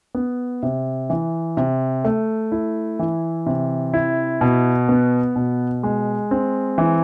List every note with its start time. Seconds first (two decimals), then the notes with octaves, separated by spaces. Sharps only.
0.15 B3
0.63 C3
1.10 E3
1.57 C3
2.05 A3
2.52 E4
2.99 E3
3.46 C3
3.94 E4
4.41 B2
4.89 B3
5.36 B2
5.83 G#3
6.31 C4
6.78 E3